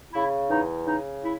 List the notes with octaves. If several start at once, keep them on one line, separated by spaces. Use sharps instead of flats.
C#3 E4
E2 D#4
C#3 D#4
E4